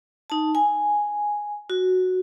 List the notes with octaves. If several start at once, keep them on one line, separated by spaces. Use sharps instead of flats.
D#4 A5
G#5
F#4